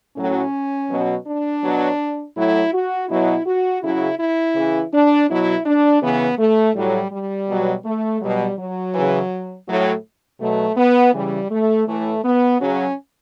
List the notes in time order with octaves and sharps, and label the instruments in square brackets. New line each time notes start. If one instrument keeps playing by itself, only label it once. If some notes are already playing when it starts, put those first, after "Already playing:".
[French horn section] A2 F#3 C#4
B2 F#3
D4
B2 F#3
A2 F#3 E4
F#4
B2 F#3 E4
F#4
C#3 F#3 E4
E4
C#3 E3
D4
B2 F#3 E4
D4
C#3 E3 B3
A3
A2 F#3 G3
G3
B2 F#3
A3
B2 F#3 G3
F#3
C#3 E3
A2 F#3
B2 F#3 A3
B3
C#3 E3 G3
A3
A2 E3 A3
B3
C#3 F#3 C#4